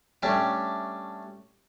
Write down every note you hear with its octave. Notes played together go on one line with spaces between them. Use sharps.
G3 A3 C#4 D4 G4